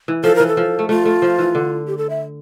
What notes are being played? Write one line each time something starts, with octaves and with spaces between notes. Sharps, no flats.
E3
F3 A4
E3 A#4
A4
F3
A3
A3 F4
A3
F3
E3
D3
G4
A4
E5